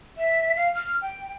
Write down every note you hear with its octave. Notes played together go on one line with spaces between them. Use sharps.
E5
F5
F6
G5